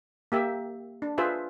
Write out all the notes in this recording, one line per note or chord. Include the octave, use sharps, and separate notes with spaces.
A#3 G4 E5
D4
F4 G#4 B4 C5 E5